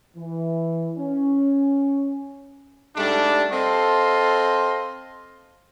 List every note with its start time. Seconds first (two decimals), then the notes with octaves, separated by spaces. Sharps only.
0.17 E3
0.97 C#4
2.96 G#2 G3 A3 D4
3.51 C4 A4 D#5 F5 C6